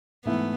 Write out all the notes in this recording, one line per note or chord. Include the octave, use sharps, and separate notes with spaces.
G#2 E3 A3 B3 E4